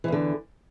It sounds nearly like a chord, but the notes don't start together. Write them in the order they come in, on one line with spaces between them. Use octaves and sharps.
E3 E2 D3